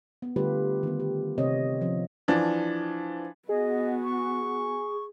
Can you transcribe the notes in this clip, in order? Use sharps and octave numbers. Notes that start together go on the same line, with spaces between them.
B3
D3 G3 A3 F4 G4 B4
D#3 B3
G4
C3 C4 C#5 D#5
F3 C#4
E3 F3 D4
B3 F#4 G#4 D#5
C#6